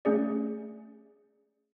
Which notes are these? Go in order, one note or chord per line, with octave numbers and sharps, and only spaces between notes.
A3 C#4 G#4 D5